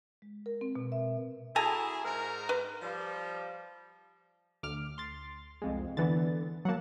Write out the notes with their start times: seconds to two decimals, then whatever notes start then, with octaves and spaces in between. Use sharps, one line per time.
0.22 G#3
0.46 A#4
0.61 C4
0.75 B2
0.92 E5
1.56 E4 F#4 G#4 A4 G#5 A#5
2.04 G#2 A#4
2.49 B4
2.81 F3 G3
4.63 D2 D6 F6
4.98 C6 A6
5.62 C2 F2 G#3
5.97 D3 E3 B3 A6
6.65 F#3 A#3 F#5 A5